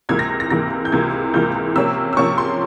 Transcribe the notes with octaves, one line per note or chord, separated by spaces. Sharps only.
C#2 C3 E3 A#3 G#6
A#6
A#6
C#2 C3 E3 A#3 A#6
G6
C#2 C3 E3 A#3 G#6
C#2 C3 E3 A#3 G6
C3 F3 A#3 C#4 E6
E6
C3 F3 A#3 C#4 C#6
C6